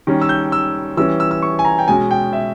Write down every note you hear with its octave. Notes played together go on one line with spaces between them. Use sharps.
D#3 G3 C#4
E6
G6
E6
E3 G3 C#4 E6
E6
E6
C#6
G#5
A#5
G5
B2 G#3 C#4 G#5
G5
E5